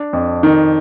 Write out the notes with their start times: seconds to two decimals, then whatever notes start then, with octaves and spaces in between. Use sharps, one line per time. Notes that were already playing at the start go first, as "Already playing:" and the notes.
Already playing: D4
0.13 F2
0.43 D#3